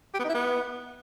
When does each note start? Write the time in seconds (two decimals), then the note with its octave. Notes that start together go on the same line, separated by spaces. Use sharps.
0.14 G4
0.19 B3
0.24 D#4
0.29 E4
0.34 B3